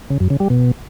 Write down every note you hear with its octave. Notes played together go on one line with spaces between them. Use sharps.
C#3
F#2
C#3
G3
B2